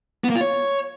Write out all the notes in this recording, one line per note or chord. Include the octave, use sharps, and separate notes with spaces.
B3
A#3
F4
C#5